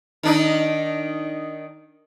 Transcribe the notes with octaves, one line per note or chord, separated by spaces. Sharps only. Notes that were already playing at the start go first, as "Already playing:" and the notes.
D#3 D4 D#4